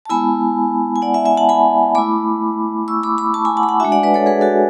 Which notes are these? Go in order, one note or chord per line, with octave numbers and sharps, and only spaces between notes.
A5
G#3 B3 E4 G#5 B5
G#5
D5 F#5
E5 G#5
E5 G#5
F#5 A5
G#5 B5
A3 E4 B5 D6
C#6 E6
B5 D6
B5 D6
A5 C#6
G#5 B5
F#5 A5
B5
F#5 A5
G#3 D4 F#4 E5 G#5
D5 F#5
B4 D5
A4 C#5
G#4 B4
F#4 A4